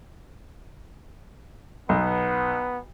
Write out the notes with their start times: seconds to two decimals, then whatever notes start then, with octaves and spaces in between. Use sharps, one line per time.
1.89 B1 B3